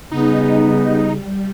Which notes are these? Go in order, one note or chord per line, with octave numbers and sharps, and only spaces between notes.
C#3 G3 B3 D#4